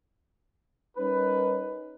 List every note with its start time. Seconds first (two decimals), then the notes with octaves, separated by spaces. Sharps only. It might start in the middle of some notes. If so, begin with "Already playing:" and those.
0.97 G3 C#4 D#4 A#4 B4